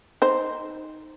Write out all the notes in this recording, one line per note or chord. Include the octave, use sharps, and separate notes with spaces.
D#4 C5